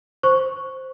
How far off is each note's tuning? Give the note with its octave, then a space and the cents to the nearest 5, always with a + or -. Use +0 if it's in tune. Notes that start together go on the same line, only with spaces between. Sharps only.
C5 +0 C#6 +0